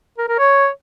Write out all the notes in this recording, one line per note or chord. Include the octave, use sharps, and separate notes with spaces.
A#4
A#4
C#5